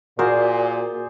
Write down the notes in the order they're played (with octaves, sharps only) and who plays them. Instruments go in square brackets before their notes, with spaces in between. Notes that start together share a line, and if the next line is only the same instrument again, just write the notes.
[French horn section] A#2 [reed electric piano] F#4 A#4 [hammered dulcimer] G#4 C5 D5